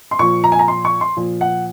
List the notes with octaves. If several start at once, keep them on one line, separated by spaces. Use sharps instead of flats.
C6
A#2 F3 C#6
A#5
G#5
A#5
C6
C#6
C6
A#2 F3
F#5